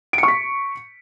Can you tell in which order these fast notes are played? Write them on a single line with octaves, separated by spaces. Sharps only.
D7 C#7 C#6 B6